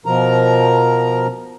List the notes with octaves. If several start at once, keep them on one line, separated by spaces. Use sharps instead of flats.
B2 F3 A#4 A#5